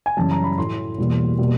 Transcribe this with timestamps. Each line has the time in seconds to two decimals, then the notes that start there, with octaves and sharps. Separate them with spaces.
0.06 G#5
0.17 F#2 C#3 E3 G3 A5
0.31 A#5
0.44 B5
0.57 A2 F#3 A3 C6
0.98 E2 B2 G3 A#3
1.39 B2 G3 A#3